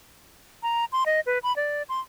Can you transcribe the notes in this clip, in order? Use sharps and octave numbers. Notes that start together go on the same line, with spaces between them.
A#5
C6
D#5
B4
B5
D5
C6